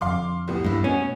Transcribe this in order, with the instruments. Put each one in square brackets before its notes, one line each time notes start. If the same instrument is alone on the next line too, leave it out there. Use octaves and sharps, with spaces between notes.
[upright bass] F2 D3 [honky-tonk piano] F5 C6 D6
[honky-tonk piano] C2 A2 B3
[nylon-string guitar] G2 E4 [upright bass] A3
[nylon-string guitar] B2 [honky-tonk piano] B3 [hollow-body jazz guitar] C#4